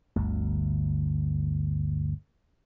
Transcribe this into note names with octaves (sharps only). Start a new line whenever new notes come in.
G1 D2